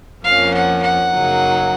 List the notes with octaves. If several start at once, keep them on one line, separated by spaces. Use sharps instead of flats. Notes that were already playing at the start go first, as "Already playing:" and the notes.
F2 F3 A#3 C#4 F5
F#5
F#5
F#2 C#3 F#3 A#3 D#4